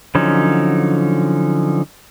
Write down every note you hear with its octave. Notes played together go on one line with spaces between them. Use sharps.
D3 F3 F#3 C#4 D#4